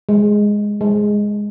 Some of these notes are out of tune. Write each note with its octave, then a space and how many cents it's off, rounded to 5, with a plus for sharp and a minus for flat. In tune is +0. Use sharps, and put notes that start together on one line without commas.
G#3 -5
G#3 -5